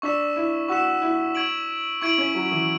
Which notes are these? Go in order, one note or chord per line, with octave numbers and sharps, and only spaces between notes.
D4 C#6 E6 B6 E7
E4
F#4 C#6 E6 B6 E7
E4
C#6 G#6 D7 F#7
E4 C#6 G#6 D7 F#7
C#4
F#3
E3